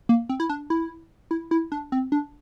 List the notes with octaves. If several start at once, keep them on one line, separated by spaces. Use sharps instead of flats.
A#3
C4
E4
D4
E4
E4
E4
D4
C4
D4